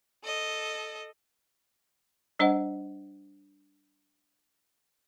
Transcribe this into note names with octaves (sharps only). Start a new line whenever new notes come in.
A4 D#5
G3 D4 C5 D#5 F#5